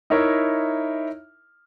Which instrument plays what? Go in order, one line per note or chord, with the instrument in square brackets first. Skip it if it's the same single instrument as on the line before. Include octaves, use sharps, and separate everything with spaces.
[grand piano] D#4 E4 A#4 C#5 E5